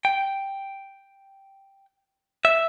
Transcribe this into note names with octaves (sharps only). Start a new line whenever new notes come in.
G5
E5